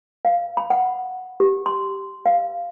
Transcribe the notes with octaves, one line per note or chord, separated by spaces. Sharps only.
F5
B5
F#5
G4
C6
F5